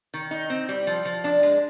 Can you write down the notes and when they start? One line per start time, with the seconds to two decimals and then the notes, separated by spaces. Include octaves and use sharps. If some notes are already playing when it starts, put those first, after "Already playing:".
0.14 D#3
0.31 D#4
0.50 C4
0.69 G3
0.87 F3
1.05 F3
1.24 D4
1.43 G#3